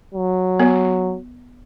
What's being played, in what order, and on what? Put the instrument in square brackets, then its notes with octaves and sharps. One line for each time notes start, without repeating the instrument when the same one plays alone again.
[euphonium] F#3
[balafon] B3